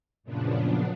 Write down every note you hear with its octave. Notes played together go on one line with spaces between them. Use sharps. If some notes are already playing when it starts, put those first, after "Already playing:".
F#2 A#2 C#3 F3 B3 D4